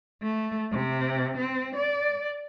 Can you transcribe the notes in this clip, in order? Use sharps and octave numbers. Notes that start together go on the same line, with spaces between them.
A3
C3
C4
D5